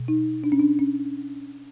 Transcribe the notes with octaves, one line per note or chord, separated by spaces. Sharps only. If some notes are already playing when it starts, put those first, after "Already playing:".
Already playing: B2
D#4
D4
C#4
D4
C#4